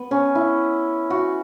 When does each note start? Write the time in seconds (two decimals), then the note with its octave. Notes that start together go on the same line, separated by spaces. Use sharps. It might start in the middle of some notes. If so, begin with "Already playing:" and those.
Already playing: B3
0.11 C#4
0.35 E4
1.10 F#4